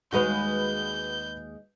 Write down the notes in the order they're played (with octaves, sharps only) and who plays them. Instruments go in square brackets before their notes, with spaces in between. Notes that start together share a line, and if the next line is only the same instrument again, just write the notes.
[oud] D#2 G#3 F5 [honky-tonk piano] F#4 B4 [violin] G6